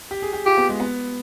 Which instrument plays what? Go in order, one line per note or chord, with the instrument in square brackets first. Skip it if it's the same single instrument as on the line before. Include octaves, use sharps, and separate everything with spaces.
[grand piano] G4
G#4
G4
[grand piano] F4 [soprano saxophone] G4
[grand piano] B3
G#3
B3